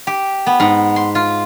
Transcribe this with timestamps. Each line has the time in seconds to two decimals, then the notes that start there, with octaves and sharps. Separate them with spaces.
0.07 G4
0.46 B3
0.60 G#2
0.96 C6
1.15 F4